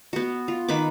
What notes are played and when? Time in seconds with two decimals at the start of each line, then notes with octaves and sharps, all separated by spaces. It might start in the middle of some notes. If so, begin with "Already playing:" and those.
0.13 B3 F#4
0.48 F4
0.69 D#3 B4 B5 D6